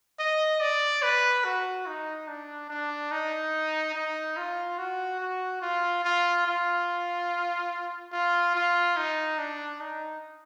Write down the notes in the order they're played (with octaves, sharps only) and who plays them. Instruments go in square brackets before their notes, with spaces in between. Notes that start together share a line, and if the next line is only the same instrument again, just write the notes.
[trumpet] D#5
D5
B4
F#4
D#4
D4
D4
D#4
D#4
F4
F#4
F#4
F4
F4
F4
F4
F4
D#4
D4
D#4